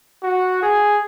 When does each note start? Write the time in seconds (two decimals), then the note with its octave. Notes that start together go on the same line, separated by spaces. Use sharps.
0.23 F#4
0.63 G#4